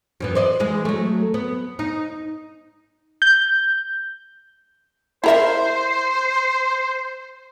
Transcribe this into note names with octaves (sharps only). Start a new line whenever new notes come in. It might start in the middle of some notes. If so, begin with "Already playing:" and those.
F#2 E3 B3
C5 D5 D#5
E3 G#3
F#3 A3
B3
D#4
G6
E4 A#4 C5 E5